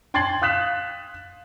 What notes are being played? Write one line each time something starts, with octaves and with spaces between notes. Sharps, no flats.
G5 C6 G#6 A6 C7 F#7
F5 D#6 F#6 B6 E7